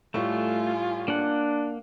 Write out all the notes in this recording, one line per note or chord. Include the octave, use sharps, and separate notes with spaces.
A2 G3 A3 F4 G#5 C#6
A#3 D4 F#5